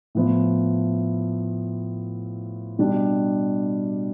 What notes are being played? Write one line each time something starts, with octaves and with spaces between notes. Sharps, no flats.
A2 F3 B3 E4
B2 G3 D4